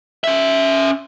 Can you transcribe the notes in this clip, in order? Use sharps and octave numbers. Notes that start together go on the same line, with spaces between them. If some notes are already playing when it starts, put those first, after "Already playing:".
C#4 E5